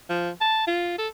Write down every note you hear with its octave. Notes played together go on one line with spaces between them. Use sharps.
F3
A5
F4
A4